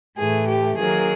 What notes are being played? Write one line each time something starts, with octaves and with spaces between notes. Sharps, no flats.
A2 E3 A3 G#4
G4
D#3 F#3 A#3 G#4